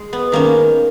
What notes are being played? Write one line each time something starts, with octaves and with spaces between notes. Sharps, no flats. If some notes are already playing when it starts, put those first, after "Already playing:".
Already playing: G#3
B3
D#3 A#3 C#4